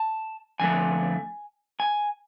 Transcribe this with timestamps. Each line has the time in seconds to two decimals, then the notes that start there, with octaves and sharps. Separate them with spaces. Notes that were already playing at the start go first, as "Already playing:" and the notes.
Already playing: A5
0.60 F2 D3 F3 A3 G#5
1.80 G#5